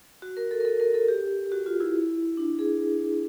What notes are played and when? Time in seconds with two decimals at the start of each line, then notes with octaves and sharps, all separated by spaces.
0.22 F#4
0.37 A#4
0.51 A4
0.60 A#4
0.65 A4
0.80 A#4
0.94 A4
1.08 G4
1.52 F#4
1.66 F4
1.80 E4
2.37 D4
2.59 G#4